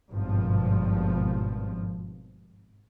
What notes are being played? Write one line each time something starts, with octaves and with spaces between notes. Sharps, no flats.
G#1 G2 B2 F3